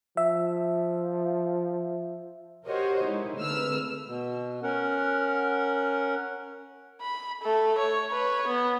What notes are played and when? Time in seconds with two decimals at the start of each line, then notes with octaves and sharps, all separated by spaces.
0.17 F3 E5
2.67 F#4 G4 A#4 C5 C#5 D#5
3.03 G#3 D#4 E4
3.40 G#1 D3 A3 B4 E6 F6
4.06 B2
4.63 C#4 A#4 F#5
7.01 B5
7.43 A3 A4
7.79 C#5
8.11 B4 C#5
8.47 B3